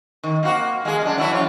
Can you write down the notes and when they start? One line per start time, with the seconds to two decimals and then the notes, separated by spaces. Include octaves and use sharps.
0.24 D#3
0.43 A#3 C4 F#4
0.85 G#3 A#3 G#4
1.02 F#2 D4
1.17 E3 F#3 E4
1.31 F#2 F4 C#5